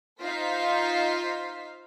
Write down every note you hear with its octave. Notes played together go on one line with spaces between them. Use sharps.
D#4 F4 C5 F5 B6